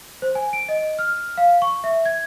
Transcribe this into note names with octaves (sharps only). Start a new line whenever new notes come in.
C5
G#5
D7
D#5
F6
F5
C#6
E5
G#6